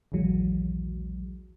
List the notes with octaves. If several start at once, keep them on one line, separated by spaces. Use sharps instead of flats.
A#1 D#2 E3 F#3 G#3